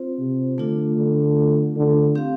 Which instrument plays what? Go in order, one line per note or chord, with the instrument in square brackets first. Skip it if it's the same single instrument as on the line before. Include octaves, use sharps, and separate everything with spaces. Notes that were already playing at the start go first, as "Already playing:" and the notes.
Already playing: [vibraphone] C4 F4 C5
[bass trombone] C3
[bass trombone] D3 [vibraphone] A3 D4 F4
[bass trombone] D3
D3
[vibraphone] C4 G4 F5